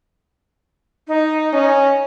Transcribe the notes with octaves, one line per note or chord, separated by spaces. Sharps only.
D#4
C#4